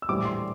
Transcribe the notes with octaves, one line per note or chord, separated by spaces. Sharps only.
E6
A#1 A2 E3 G3 D6
C6